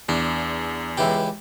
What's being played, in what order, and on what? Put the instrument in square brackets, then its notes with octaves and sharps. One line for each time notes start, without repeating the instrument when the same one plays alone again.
[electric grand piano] E2 [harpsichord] D4
[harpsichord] C#2 E3 G4